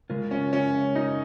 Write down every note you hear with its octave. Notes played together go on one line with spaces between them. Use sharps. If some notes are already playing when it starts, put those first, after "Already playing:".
C#3 G#3 F4 A#4
C#4
C#4
D#4